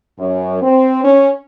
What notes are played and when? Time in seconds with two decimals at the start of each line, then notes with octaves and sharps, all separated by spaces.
0.19 F#2
0.62 C4
1.04 C#4